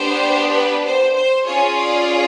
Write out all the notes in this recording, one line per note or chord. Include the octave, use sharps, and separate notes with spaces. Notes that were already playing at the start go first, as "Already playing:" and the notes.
Already playing: B3 D4 G4 C5
B4
C5
C5
C#4 F4 G#4 C#5
D5